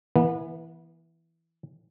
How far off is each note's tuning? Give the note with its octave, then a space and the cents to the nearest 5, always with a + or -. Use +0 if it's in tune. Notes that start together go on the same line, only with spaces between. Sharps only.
E3 +0 B3 -35